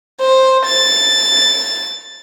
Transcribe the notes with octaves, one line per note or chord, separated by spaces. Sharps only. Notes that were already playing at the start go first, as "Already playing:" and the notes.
C5
A6